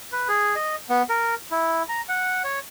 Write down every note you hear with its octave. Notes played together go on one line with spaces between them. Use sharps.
B4
G#4
D#5
B3
A#4
E4
A#5
F#5
C#5